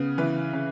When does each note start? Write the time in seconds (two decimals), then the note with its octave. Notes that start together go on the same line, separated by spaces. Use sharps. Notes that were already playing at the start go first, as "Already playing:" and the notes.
Already playing: C#3 B3
0.18 E3 B4
0.53 C#3